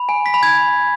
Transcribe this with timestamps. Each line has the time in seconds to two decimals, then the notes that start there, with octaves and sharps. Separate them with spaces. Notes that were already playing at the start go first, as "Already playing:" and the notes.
Already playing: B5
0.09 G#5
0.26 B6
0.34 B5
0.43 G#6